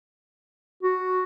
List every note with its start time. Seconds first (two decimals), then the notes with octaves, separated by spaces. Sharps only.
0.83 F#4